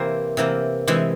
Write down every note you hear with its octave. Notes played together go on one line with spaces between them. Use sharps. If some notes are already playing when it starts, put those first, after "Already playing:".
Already playing: C3 E3 A#3 C5
C3 E3 A#3
C3 E3 G#3